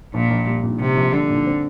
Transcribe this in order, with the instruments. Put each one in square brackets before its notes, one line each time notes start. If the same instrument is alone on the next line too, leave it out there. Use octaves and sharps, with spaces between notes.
[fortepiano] A#1 [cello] A#2
[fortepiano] A#1
G3
A#2
[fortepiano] A#1 [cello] C3
[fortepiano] A#1
[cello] D3 [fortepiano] G3
[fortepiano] A#2
C4